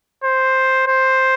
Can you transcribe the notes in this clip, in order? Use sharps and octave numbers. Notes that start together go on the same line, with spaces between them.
C5
C5